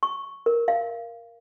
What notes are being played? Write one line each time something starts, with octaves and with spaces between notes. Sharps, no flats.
C#6
A#4
F5